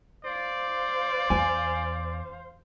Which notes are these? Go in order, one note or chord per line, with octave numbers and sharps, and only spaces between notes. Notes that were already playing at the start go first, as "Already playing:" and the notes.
C5 D5 F5
E2 G#5